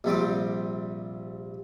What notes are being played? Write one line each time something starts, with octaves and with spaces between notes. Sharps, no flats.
A#1 C3 G3 D6